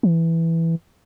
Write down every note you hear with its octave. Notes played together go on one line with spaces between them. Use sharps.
E3